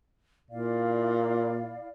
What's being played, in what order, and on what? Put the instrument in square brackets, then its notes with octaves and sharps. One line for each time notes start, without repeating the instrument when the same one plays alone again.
[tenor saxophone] A#2 [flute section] E4 D5 F5